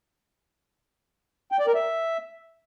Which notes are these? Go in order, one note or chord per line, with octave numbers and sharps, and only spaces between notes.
G5
D5
A#4
E5